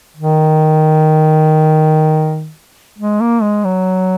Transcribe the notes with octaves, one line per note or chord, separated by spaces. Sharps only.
D#3
G#3
A#3
G#3
F#3